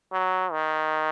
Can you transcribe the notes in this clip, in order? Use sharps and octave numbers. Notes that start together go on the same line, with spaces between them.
F#3
D#3